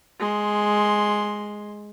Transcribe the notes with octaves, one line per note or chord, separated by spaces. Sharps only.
G#3 C6